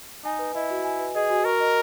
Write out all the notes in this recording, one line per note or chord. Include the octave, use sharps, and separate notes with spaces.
D#4 G#5
B4
E4 D#5
F#4
G#5
B4
G#4 D#5
F#4
A#4 C#6
D#5